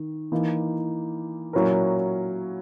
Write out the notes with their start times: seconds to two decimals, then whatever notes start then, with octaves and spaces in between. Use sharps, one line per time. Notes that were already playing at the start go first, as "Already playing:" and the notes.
Already playing: D#3
0.32 E3 A#3 D#4
1.53 A#2 F#3 C#4 E4 A#4